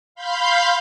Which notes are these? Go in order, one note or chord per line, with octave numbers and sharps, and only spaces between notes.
F5 B5 C6 G6